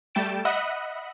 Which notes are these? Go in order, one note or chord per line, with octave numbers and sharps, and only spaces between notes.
G3 A3 G5 A6 D7 E7
D#5 E5 F#5 B5 D#6 F#6